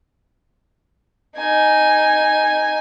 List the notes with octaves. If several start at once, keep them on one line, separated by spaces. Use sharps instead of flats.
D#4 G#5